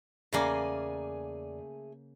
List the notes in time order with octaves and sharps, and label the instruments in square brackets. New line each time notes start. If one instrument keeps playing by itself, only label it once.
[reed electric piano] E2 D5 [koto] C#3 A#3 [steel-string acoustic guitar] A3 G#4 G#5